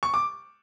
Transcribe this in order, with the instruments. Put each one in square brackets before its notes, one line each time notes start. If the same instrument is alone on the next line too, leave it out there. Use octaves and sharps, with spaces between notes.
[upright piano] C#6
D6